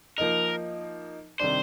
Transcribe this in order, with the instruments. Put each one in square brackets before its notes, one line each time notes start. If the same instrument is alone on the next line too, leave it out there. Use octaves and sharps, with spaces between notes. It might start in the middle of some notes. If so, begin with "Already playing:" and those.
[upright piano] F3 A#3 D#4 [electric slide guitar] A#4
[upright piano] C3 D#3 G3 D4 [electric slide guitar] C5